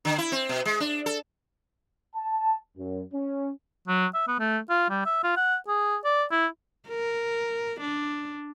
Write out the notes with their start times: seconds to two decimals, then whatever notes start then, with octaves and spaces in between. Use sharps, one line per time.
0.05 D3
0.18 E4
0.32 C4
0.49 B2
0.65 G#3
0.80 D4
1.06 A4
2.16 A5
2.78 F#2
3.14 C#4
3.88 F#3
4.14 E5
4.27 B3
4.39 A3
4.69 F4
4.89 G3
5.06 E5
5.23 F4
5.37 F#5
5.68 G#4
6.05 D5
6.31 E4
6.88 A#4
7.81 D4